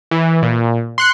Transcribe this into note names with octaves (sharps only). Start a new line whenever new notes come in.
E3
A#2
C6 F#6 C#7